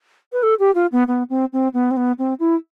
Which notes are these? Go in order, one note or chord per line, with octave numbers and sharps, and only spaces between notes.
B4
A4
G4
F4
B3
B3
C4
C4
B3
C4
B3
C4
E4